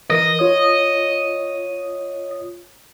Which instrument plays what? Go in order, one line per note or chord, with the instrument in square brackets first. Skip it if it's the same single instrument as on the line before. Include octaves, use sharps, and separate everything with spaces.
[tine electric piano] E3 A#4 A#6 [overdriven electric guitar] D#5
[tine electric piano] F4 C#5 D#6